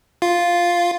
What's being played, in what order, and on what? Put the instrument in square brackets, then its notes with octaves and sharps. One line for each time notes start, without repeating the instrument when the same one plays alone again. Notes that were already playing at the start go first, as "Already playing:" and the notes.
[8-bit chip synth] F4